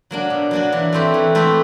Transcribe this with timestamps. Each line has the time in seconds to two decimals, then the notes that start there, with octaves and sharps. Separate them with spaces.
0.11 F#3 A#3 D4
0.30 B2
0.51 F#3 A#3 D4
0.72 E3
0.93 A3 C4 E4 G4
1.14 E3
1.35 A3 C4 E4 G4